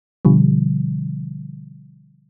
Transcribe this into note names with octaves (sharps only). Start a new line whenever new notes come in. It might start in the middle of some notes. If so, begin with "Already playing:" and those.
B2 D3 F3 G3